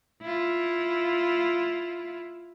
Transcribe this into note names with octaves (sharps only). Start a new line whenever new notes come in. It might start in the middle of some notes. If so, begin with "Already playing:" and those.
E4 F4